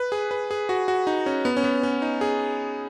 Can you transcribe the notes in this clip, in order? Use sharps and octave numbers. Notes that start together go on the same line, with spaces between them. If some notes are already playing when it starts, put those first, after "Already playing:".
Already playing: B4
G#4
B4
G#4
F#4
F#4
D#4
C#4
B3
C#4
B3
C#4
D#4
G#4